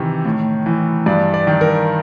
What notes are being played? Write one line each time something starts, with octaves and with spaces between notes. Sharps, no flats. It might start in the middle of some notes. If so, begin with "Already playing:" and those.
Already playing: C3 D#3 E3
A2
E3
G2 D5
D5
D#3
A#4